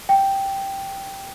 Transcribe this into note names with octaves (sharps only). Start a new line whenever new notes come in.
G5